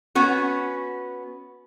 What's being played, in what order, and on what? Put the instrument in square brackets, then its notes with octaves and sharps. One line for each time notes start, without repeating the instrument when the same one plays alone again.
[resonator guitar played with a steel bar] B3 C#4 F#4